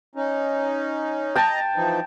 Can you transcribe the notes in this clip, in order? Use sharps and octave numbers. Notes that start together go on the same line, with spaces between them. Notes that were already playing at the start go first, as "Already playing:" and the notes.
C#4 D#4
D#5 G5 A5 A#5
E3 F3 D#4